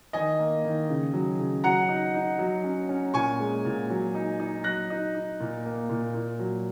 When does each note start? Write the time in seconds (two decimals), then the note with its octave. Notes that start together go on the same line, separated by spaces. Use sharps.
0.13 D#3 D#5 G#5
0.39 A#3
0.64 D#3
0.89 C#3
1.13 F#3
1.39 C#3
1.64 F#3 F#5 A#5
1.89 D#4
2.15 D#4
2.39 F#3
2.64 C#4
2.89 C#4
3.14 A#2 G#5 C#6
3.40 G#3
3.65 A#2
3.90 F#3
4.15 D#4
4.40 D#4
4.64 F#3 F#6 A#6
4.90 D#4
5.15 D#4
5.40 A#2
5.65 A#3
5.89 A#2
6.14 A#2
6.39 F#3